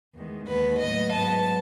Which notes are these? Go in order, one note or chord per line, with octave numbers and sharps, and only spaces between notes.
E2 D#3 G#3
D#2 D#3 G#3 B3 B4
A2 F#3 B3 D#5
G#2 F#3 B3 A5